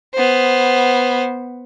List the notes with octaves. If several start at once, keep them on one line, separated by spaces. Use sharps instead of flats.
B3 C5